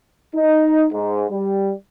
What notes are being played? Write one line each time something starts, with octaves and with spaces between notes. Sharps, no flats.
D#4
G#2
G3